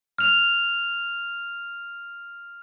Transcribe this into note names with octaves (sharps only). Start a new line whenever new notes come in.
F6 F7